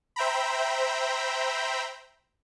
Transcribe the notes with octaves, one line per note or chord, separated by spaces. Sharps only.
C5 E5 G5 A#5 B5